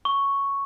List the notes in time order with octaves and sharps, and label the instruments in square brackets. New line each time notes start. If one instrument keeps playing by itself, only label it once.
[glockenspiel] C#6